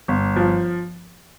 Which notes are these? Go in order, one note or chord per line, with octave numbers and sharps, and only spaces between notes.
G1
F3